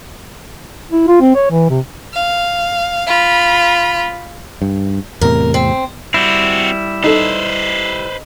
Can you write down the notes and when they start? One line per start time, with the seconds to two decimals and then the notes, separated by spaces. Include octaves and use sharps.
0.92 E4
1.08 F4
1.21 C4
1.36 C#5
1.51 E3
1.70 C3
2.14 F5
3.07 F4 B5
4.62 G2
5.21 E2 A2 C3 A#4
5.54 C4
6.14 G3 C4 E4 F#4
7.04 D#4 A4 B4 C5